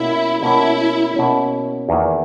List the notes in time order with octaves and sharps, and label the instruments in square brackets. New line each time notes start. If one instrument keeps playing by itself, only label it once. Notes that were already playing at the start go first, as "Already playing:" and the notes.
Already playing: [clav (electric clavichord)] B2 A#3 C#4 [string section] E4
[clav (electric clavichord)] B2 A#3 C#4 [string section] E4
[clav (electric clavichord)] B2 A#3 C#4
E2 D#3 A#3 E4